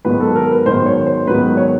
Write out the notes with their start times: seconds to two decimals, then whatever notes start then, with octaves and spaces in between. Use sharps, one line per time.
0.05 G#2 D#3 F#3 B3 B4
0.20 A4
0.36 A#4
0.51 B4
0.66 G#2 D#3 F#3 B3 C5
0.86 C#5
1.06 C5
1.27 G#2 D#3 F#3 B3 B4
1.57 C#5